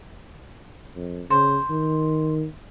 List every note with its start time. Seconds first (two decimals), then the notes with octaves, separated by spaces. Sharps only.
0.96 F2
1.30 C#3 C5
1.70 D#3